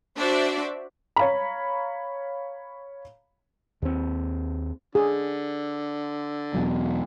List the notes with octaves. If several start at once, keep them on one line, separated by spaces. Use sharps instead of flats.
D4 F#4 C5 D5 E5
C#5 F5 A#5 B5
D#2 C4
D3 G#4
E2 B2 F#3